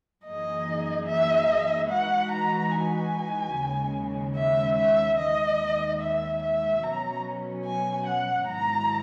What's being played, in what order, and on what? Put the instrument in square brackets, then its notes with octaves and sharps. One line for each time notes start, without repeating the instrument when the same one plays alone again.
[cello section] F#2 E3 A#3 D#4 G#4 [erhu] D#5
[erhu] E5
[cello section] E3 G#3 D#4 F#4 B4 [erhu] F#5
[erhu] A#5
G#5
[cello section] D#2 C#3 G#3
[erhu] E5
E5
[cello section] D#2 D#3 G#3 [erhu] D#5
[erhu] E5
E5
[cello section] B2 F#3 C#4 [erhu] A#5
[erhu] G#5
F#5
[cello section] G#2 D#3 F#3 B3 E4 [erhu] A#5